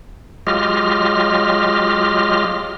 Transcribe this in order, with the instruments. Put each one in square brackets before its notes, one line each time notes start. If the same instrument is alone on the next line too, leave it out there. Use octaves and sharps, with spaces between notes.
[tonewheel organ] F#3 G#3 F4 G4 D#5 F6